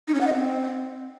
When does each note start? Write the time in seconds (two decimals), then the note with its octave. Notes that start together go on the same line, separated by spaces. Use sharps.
0.08 D#4
0.14 C#4
0.21 F#5
0.27 D#5
0.34 C4